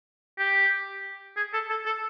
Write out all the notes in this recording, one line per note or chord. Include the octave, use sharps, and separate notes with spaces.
G4
G#4
A4
A4
A4